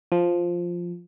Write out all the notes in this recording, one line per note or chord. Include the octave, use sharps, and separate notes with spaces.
F3